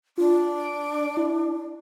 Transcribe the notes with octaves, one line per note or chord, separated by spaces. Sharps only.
D4 F4
D7
E4